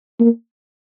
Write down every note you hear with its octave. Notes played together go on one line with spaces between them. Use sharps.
A#3